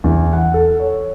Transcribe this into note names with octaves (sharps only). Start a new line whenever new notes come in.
E2
F#5
A4
C#5